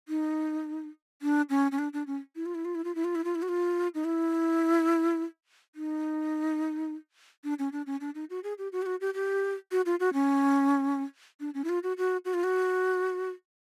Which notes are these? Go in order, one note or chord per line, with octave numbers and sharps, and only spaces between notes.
D#4
D4
C#4
C#4
D4
D4
C#4
E4
F4
E4
F4
E4
F4
E4
F4
E4
F4
E4
F#4
F4
D#4
E4
D#4
D4
C#4
D4
C#4
D4
D#4
F#4
G#4
G4
F#4
G4
F#4
G4
G4
F#4
F4
F#4
C#4
D4
C#4
E4
F4
F#4
F#4
F#4
F4
F#4